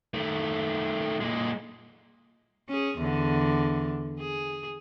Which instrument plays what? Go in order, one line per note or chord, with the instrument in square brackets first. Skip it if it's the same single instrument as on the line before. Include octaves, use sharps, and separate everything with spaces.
[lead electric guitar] D#3 A3
A#2 G#3
[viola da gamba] C#4 G#4
E2 D3
G#4